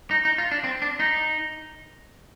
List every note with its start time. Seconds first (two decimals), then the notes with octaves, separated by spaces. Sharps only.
0.11 D#4
0.25 D#4
0.38 F4
0.51 D4
0.64 C4
0.82 D4
1.00 D#4